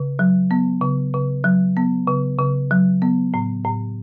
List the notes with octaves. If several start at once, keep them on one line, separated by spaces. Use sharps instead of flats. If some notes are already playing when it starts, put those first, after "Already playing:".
Already playing: C#3
F#3
B3
C#3
C#3
F#3
B3
C#3
C#3
F#3
B3
A2
A2